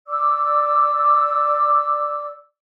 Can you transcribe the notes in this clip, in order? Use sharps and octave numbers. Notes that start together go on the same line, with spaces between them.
D5 D6 E6